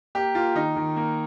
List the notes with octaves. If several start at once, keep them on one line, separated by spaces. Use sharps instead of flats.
A#3 G4
A#3 F4
D#3 D#4
D#3
A#3